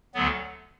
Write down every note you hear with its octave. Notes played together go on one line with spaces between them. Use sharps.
D2 D3 F#3 B3